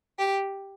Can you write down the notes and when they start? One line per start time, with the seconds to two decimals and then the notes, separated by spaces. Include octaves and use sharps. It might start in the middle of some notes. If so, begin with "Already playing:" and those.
0.18 G4